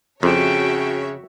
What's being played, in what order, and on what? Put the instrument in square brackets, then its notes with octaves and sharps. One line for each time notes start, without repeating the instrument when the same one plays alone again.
[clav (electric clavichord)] F2 [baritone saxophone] C#3 [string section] F#4 C#5 E5 [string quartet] G5 A5